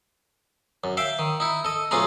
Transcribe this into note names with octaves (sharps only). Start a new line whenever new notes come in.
F#2
E5 F5 G5
D#3
D#4 E4
A4 D#5
B1 A3 C#4 F4 G#4 A#5